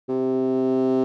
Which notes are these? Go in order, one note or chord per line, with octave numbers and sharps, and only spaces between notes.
C3